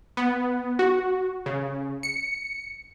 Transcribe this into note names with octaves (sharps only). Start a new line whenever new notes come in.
B3
F#4
C#3
C#7